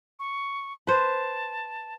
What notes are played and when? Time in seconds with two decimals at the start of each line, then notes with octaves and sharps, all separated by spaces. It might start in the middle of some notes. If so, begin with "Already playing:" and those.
0.19 C#6
0.87 B4 C5 A5